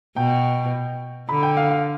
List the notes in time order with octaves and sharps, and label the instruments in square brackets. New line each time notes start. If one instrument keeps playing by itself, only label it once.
[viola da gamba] B2 [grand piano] G5
[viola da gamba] D3 [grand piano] B5
[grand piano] G5
F5
F5